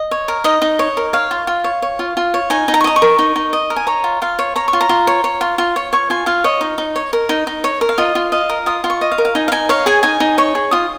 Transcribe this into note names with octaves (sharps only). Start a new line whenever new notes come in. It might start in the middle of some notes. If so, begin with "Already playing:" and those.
Already playing: D#5
C#5
A#4
D#4 D#5
D#4
C#5
A#4
C#5 F5
F4
F4
C#5
C#5
F4
F4
C#5
D#4 G#5
D#4
A#5
C#6
D#5 A#5
C#6
A#4
D#4
D#4
D#5
A#4
G#5
C#5 A#5
F4
F4 F5
C#5
C#5 A#5
C#6
F4
A#5
F4
C#5
C#5
F4
F4
C#5
C#5 C#6
F4 G#5
F4 F5
C#5 D#5
D#4
D#4
C#5
A#4
D#4
D#4
C#5
A#4
F5
F4 D#5
F4
D#5 F5
A#4
F4 D#6
F4
C#6
D#5
F5
A#4
F5
D#4 G#5
F5
D#4 G#5
C#5 F5
G#4 G#5
D#4 G#5
D#4
C#5 C#6
G#4
F4 D#6